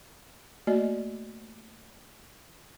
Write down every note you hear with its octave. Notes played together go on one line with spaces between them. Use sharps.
A3 A#3 F#4 D5 D#5